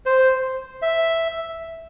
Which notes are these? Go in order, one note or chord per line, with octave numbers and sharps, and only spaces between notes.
C5
E5